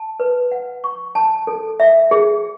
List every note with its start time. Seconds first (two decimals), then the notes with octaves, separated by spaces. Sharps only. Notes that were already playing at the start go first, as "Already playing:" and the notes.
Already playing: A5
0.20 B4
0.52 F#5
0.84 C#6
1.15 A5
1.47 A4
1.80 E5
2.11 G#4